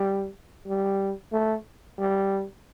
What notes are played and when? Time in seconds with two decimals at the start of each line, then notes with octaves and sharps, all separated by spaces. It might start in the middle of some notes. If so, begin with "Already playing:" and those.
Already playing: G3
0.67 G3
1.33 A3
1.99 G3